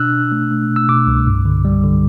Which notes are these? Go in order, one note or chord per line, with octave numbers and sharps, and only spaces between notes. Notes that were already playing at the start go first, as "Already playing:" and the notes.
Already playing: B2 D4 E6 F#6
D4
A3
A3
B2
E6
B2 D6
C2
G2
D3
G3
D3